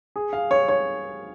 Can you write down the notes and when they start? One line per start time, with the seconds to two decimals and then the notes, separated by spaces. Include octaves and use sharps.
0.16 G#4
0.33 F5
0.51 C#5
0.69 C#5